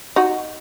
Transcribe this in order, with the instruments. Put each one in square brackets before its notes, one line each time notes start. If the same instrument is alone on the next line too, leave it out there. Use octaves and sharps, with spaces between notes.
[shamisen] D#4 F#4